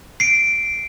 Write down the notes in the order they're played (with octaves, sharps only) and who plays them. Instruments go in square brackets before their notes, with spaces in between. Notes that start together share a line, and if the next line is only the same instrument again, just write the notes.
[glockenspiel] C7 D7